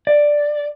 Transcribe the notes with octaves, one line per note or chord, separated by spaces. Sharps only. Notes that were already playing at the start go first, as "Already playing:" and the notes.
D5